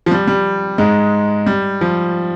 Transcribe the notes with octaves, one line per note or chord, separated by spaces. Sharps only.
F3
G3
G3
G#2 G#3
G3
F3